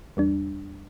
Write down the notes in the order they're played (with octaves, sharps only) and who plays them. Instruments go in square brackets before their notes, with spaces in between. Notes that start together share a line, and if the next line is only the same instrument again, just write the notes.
[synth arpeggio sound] E2 G3 D4